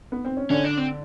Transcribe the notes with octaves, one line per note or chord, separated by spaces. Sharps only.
B3
C4
C#4
D3 C#4 D4
D4
C4